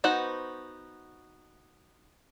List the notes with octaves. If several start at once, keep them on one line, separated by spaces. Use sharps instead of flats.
B3 D#4 F#4 C5 F#5